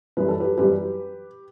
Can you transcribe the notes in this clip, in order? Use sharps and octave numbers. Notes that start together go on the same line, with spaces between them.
F#2 E3 G3 B4
A4
G4 B4
F#2 E3 G3 G4 B4